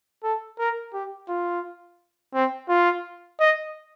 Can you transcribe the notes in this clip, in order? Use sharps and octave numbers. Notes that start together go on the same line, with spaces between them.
A4
A#4
G4
F4
C4
F4
D#5